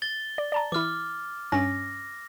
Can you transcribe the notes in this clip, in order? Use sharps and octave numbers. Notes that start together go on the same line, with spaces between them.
A6 G7
D5
D5 A5 A#5
E3 E4 D6 F6
G2 C#4 A#6